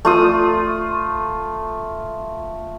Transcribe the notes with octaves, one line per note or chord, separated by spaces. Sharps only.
A3 F4 D#6